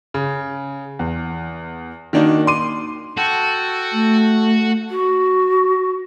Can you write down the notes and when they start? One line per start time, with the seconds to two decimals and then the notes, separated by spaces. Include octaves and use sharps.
0.14 C#3
0.99 E2
2.13 D#3 A#3 D4 D#4 F#4
2.47 C6 D6 D#7
3.17 F#4 A4 G5
3.92 A3
4.90 F#4